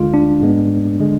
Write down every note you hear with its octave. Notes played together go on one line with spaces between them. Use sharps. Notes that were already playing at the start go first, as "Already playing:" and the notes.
Already playing: D2 D3 G#3 F4
D4
G#2 G#3 B3
D3 G#3